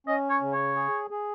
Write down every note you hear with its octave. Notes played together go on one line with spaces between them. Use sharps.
C#4 D#5
C#5
C#3
C#5
G#4
G#4